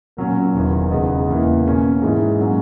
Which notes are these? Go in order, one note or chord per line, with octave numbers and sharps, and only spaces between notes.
A#2 F#3 C#4
E1 E2 D#3
E2 C#3 G#3 B3 D#4
E2 C#3 E3 A#3
B2 A#3 C#4
G#2 E3 G#3 D#4
A#2 F#3 C#4